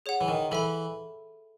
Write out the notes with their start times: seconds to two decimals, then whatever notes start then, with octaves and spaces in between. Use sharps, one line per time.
0.06 G#4 C#5 F#5
0.21 E3
0.28 D#3
0.51 E3 A4 E5 B5